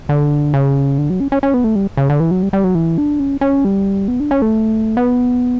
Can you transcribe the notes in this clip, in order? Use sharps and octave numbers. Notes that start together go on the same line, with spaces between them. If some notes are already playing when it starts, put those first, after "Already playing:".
D3
C#3
D3
F#3
C#4
C#4
C#4
B3
A3
G3
C#3
D3
E3
F#3
G3
G3
F#3
E3
D4
C#4
C#4
G3
B3
D4
C#4
A3
B3